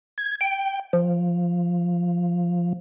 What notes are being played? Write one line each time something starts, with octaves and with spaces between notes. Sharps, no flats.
G#6
G5
F3